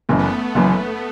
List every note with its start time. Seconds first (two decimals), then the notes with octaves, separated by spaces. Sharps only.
0.09 F#1 F#2 E3 A3
0.19 B3
0.29 A3
0.55 F#1 F#2 E3 A3